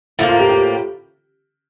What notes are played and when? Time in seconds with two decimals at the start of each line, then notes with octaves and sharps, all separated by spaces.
0.19 A2 F3 A#3 E4
0.29 F4
0.39 G4
0.49 G4